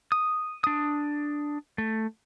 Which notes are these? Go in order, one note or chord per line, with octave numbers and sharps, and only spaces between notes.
D#6
D4 D#6
A3